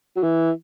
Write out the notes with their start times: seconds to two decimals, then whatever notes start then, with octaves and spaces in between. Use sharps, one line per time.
0.16 F#3
0.23 E3